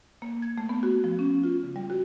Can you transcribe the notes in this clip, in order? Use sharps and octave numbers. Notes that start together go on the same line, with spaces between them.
A#3
G#6
A3
B3
F#4
F3
C#4
F4
C#3
G3
F#4